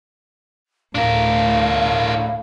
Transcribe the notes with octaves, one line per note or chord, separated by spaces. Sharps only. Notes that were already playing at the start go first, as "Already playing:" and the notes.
D2 A2 D4 A#4 F5